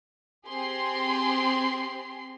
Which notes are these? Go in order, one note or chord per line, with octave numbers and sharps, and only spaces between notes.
C4 G4 G#4 C6 C7